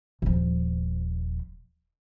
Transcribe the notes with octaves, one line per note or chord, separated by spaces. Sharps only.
D#1 F3